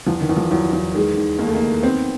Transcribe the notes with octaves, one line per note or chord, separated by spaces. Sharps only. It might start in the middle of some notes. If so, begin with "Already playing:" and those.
E2 F3
D#3
E2
F3
E2 F#3
E2
D#3 G#3
D#2
D#2 A#3
A3
A#3
D#3
B3 C4